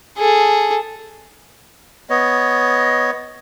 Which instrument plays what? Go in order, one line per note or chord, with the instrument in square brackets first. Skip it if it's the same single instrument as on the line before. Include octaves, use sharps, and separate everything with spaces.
[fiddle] G#4 A4
[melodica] B3 C#5 D#5